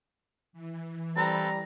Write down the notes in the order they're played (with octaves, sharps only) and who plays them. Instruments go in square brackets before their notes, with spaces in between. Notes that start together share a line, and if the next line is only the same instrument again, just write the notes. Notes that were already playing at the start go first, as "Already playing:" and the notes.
[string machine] E3
[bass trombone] G3 [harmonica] C4 A4 B4 [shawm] A#5